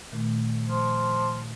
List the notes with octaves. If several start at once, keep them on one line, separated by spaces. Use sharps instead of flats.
A#2 D#3 A3
F3